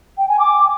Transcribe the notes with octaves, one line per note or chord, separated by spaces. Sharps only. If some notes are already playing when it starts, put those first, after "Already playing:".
G5
G#5
D6